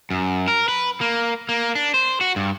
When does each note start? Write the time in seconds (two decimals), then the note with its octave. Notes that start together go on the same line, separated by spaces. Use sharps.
0.11 F#2
0.48 A#4
0.68 B4
1.01 A#3
1.49 A#3
1.75 D4
1.94 C5
2.21 F#4
2.36 G2